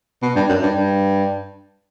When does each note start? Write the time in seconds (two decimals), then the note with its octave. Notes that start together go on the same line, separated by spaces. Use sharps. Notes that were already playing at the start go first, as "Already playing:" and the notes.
0.23 B2
0.36 G2
0.49 F#2
0.63 G2
0.76 G2